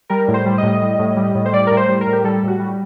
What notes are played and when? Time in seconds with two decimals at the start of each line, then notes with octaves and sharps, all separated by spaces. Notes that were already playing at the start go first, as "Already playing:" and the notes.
0.10 G3 A#4
0.28 A2
0.34 C5
0.46 G3
0.58 A2 D#5
0.81 G3
0.99 A2
1.17 G3
1.35 A2
1.46 C5
1.52 G3 D5
1.67 A2 A#4
1.77 C5
1.88 G3
2.01 A#4
2.07 A2
2.13 G4
2.24 G3 A4
2.43 A2 F#4
2.60 G3